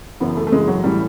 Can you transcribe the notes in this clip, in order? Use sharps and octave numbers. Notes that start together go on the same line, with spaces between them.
F#2 C#3 E3 B3
A3
A3
F#2 C#3 E3 G#3
F#3
A2 E3 G3